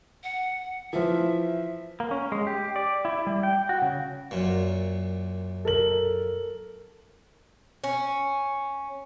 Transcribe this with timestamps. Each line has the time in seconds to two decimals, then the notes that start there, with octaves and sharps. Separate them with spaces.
0.24 F#5
0.93 E3 F3 E5
2.00 A#3
2.11 C#4
2.32 G#3
2.47 G4
2.76 D5
3.05 E4
3.27 G3
3.43 G5
3.69 F#4
3.82 C#3
4.31 F#2 A#2
5.65 A4 A#4 F#7
7.84 C#4